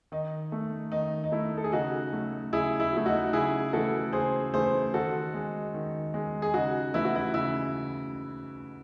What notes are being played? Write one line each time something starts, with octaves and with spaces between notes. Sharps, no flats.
D#3 D#4
A3
D#3 D#4
D#4
A3 E4
A4
G#4
C#3 D#4 F#4
F#3 A3
C#3 E4 G#4
E4
F#3 A3 E4
D#4 F#4
C#3 E4 G#4
E3 A3 F#4 A4
C#3 G#4 C5
E3 A3 G#4 C5
D#3 F#4 A4
G#3
D#3
G#3
G#4
C#3 D#4 F#4
E3 A3 E4
F#4
E4
C#3 E4